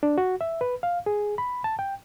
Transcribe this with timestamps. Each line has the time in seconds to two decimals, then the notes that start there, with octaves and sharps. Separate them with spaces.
0.03 D4
0.18 F#4
0.41 E5
0.61 B4
0.83 F5
1.06 G#4
1.38 B5
1.64 A5
1.79 G5